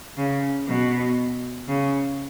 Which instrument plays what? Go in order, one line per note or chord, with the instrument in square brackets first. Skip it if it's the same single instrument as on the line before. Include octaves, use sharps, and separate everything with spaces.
[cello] C#3
B2
C#3